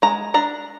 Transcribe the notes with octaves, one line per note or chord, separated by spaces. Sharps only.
G#3 A#5
D4 A#5